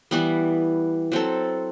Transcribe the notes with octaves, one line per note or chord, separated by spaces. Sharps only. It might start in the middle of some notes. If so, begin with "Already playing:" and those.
E3 G3 B3
F#3 C4 E4 A4